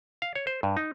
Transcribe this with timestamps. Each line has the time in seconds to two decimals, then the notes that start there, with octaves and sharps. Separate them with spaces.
0.22 F5
0.35 C#5
0.47 C5
0.63 G2
0.77 D#4